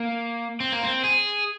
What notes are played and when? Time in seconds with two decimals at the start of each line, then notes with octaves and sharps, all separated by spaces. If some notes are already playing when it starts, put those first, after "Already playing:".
Already playing: A#3
0.60 C4
0.72 A#3
0.83 C4
1.04 G#4